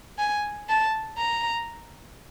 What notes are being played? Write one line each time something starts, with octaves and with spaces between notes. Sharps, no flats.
G#5
A5
A#5